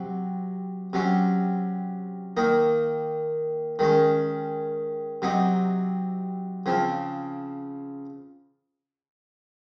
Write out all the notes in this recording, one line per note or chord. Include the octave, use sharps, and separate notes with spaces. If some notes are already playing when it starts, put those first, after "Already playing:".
Already playing: C3 F#3
C3 F#3 C#4
D#3 A#3 D#4
D#3 G#3 C#4
C3 F#3 C4 D#4
C#3 F3 C4